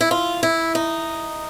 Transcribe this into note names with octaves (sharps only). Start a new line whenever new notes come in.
E4
F4
E4
D#4